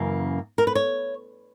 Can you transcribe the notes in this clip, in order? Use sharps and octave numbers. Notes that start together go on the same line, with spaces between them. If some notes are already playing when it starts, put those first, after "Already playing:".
Already playing: F#2 C#3 E3 A#3
A#4
B4
C#5